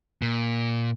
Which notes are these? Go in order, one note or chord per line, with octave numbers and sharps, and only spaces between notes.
A#2